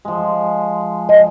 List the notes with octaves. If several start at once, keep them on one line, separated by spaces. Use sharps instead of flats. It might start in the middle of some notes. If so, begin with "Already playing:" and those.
F3 G#3
D#5